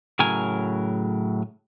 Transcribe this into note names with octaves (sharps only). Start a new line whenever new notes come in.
A2 C#3 F#3 A#4 G#5